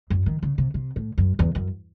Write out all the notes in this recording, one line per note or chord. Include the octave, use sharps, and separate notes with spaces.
F#2
D#3
C#3
C3
C3
A2
F#2
E2
F#2